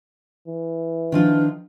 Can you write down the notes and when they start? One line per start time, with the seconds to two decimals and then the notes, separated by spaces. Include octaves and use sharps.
0.47 E3
1.12 D#3 F3 D4 F4